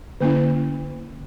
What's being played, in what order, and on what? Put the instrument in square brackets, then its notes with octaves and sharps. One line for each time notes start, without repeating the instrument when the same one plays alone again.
[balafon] D3 A#3 C#4 E4